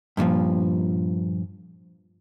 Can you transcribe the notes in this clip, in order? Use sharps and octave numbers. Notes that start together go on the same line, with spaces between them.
G2 A#2 D#3 F3